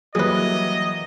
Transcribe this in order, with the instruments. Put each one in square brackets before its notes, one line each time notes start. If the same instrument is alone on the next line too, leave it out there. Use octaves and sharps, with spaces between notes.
[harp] E3 D#6 [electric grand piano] F#3 G3 A#3 [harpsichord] G#4 B4 [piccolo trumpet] D#5